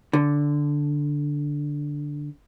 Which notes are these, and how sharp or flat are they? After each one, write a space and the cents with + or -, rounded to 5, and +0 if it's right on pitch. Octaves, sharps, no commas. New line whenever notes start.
D3 -5